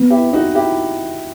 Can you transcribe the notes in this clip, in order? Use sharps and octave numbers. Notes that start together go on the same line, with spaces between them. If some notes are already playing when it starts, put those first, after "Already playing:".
Already playing: B3
E4 G4
D#4 F#4
E4 G4